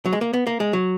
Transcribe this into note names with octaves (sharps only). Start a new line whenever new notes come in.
F#3
G#3
A#3
B3
A#3
G#3
F#3